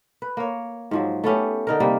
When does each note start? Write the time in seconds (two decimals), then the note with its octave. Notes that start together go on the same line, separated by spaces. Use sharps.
0.22 B4
0.37 A#3 C#5
0.91 G#2 F3 F#3
1.24 A3 B3 C#4 G4
1.67 D3 D#4 A#4
1.80 C3 G3 A#3